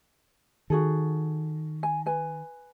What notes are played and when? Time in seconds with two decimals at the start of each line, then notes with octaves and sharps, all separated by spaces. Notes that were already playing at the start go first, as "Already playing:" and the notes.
0.70 D#3 F#4 G#4 A4
1.83 G#5
2.06 B4 G#5